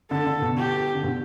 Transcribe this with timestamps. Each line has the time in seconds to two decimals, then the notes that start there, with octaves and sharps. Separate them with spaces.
0.11 D3 A4
0.26 D3
0.42 B2
0.57 G4
0.95 D3
1.04 B2